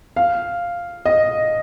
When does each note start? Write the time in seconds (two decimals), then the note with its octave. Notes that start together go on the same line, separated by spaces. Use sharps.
0.16 F5
1.06 D#5